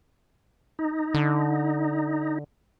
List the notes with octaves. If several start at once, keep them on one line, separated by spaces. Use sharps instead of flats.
D#4
D3